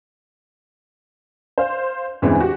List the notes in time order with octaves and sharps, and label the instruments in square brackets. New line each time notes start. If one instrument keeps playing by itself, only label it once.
[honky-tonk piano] C5 F5
E2 G2 C#3 E3 G#3 C4
F#4 G4